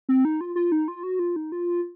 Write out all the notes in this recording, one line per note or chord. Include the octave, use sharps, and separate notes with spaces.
C4
D#4
F4
F4
D#4
F4
F#4
F4
D#4
F4